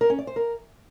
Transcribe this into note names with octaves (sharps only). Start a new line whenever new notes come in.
A#4
C#4
D5
C5
A#4